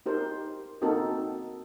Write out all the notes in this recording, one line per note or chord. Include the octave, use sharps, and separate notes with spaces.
D#4 G4 A#4 C5
A#3 C4 D#4 F#4 A4 A#4